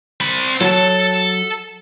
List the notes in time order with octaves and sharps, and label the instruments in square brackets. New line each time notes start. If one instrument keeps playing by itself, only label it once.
[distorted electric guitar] C4 B5
[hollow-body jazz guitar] F#3 [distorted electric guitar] A4 A5